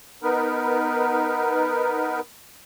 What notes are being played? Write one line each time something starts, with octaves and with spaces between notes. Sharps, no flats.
B3 D#4 A#4 B4